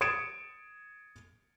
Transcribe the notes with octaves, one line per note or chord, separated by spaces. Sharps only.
D#6 G#6 A6 C#7 D7 E7